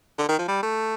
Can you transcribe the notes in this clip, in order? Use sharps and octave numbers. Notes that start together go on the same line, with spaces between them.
D3
D#3
F3
G3
A3